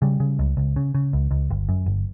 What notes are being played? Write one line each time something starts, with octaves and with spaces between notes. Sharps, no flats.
C#3 G3
C#3
C#2
C#2
C#3
C#3
C#2
C#2
G1
F#2
G1